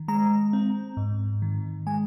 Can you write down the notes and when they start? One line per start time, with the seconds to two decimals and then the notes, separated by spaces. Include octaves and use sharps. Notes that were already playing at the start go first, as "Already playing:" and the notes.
Already playing: D#3
0.08 G#3 A#5
0.53 C4
0.97 G#2
1.42 D#3
1.87 G#3 G#5